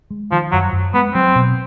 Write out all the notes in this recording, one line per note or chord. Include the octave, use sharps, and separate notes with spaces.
G#3
D#3 F3
F#2 F#3
F#2
G#3 B3
F#3 C4
B2